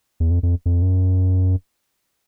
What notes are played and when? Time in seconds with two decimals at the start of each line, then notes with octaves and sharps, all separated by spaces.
0.20 E2
0.31 F2
0.43 F2
0.66 F2
0.82 F#2